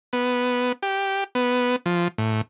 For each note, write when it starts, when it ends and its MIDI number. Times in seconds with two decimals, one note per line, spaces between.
0.13 0.72 59
0.83 1.24 67
1.35 1.76 59
1.86 2.08 53
2.18 2.41 45